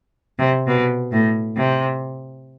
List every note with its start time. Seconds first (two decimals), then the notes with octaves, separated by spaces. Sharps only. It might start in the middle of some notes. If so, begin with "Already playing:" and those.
0.39 C3
0.67 B2
1.12 A2
1.56 C3